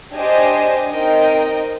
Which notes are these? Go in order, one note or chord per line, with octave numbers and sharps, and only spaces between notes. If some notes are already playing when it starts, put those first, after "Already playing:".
D4 G4 C5 D#5 G#5
C4 D#4 A#4 D#5 G5